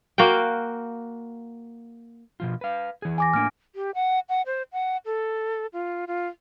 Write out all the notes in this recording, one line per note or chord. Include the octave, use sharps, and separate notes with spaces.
A#3 F#4 F5 G5
B2 F3 F4
B4 F5
E3 G#4
G#5 D6 A#6
A2 A#3 D4 F6 D7
G4
F#5
F#5
C5
F#5
A4
F4
F4